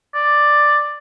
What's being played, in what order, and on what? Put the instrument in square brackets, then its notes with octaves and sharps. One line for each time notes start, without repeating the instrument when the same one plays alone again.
[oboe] D5